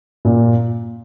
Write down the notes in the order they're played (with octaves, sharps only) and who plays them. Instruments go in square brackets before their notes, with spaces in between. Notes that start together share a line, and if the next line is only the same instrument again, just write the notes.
[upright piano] A#2